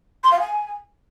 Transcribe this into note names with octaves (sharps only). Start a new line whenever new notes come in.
C6
F5
G#5